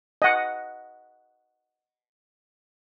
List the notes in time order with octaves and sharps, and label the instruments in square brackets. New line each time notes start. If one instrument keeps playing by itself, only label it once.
[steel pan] D#5 F#5